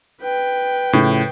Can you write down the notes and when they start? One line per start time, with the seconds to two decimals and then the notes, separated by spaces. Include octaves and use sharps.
0.22 B4 G5
0.93 A2 C#3 F3